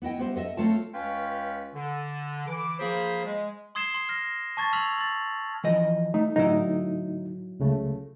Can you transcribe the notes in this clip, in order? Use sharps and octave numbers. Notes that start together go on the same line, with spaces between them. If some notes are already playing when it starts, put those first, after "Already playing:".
B3 E4 D#5 G5
G3 B3 C5 E5
A4 D#5 E5
A3 C4 F4 A4 C#5 A5
C#2 C#4 F4 B4 F5 G5
D3
E3 D6
F3 A#3 F4 G#4 C5 B5
G#3
C6 D#6 G#6 C7 E7 G7
C6
F6 A#6
A5 C#6 G#6 A6
E6 F6 G#6 B6 F7 F#7
A6 F#7
E3 F3 D#5
A3 D#4
A2 D3 F#3 D#4 E4
C#2 C#3 A3